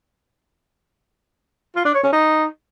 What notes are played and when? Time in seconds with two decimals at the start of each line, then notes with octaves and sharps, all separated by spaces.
1.76 F4
1.85 D4
1.94 C#5
2.03 C#4
2.12 D#4